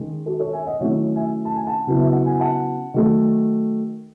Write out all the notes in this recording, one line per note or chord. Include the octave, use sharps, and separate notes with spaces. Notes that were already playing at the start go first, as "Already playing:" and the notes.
Already playing: D#3 G#3 C#4
F#4 A4
A4 C#5
E5 G#5
D#5 F#5
D#3 F#3 A3 C#4 E4 C#5 E5
E5 G#5
A5
G#5
F#5 A5
C#3 F#3 B3 E4
E5
F#5
G#5
F#5 A5
D#3 F#3 A3